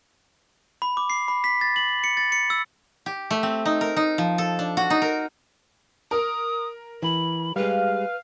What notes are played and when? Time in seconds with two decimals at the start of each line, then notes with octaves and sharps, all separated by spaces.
0.82 B5
0.97 D6
1.10 C7
1.28 B5
1.44 B6
1.61 A6
1.76 F#7
2.04 C#7
2.17 A6
2.32 C#7
2.50 E6
3.06 G4
3.31 A3
3.43 C4
3.65 D#4
3.81 A#4
3.96 D#4
4.18 F3
4.38 A4
4.59 D4
4.77 F#4
4.90 D#4
5.02 A#4
6.11 A#4 D#6
7.03 E3 B5
7.56 G3 G#3 B4 F5